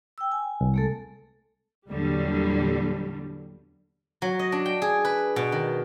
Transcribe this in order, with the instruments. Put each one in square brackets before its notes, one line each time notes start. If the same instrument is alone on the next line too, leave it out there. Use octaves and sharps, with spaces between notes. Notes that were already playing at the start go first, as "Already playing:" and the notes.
[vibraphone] G5 E6
G#5
[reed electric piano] C2
[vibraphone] G#3 A3 A4
[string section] E2 A#2 D3 F#3 G3
[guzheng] F#3
D#5
D4
G5
G#4
B4
B2
D#3